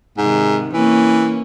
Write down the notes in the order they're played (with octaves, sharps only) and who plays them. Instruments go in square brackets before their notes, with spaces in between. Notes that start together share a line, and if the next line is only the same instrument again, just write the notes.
[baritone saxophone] G#2 [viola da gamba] C3 D#3
[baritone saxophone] E3 [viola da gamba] A#3 C#4 C#5